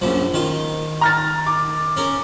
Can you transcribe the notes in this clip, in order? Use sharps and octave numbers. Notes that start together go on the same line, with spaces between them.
A#1 F#2 F3
D#3 F4
A#5 F6 A6
D6
C#4 A#4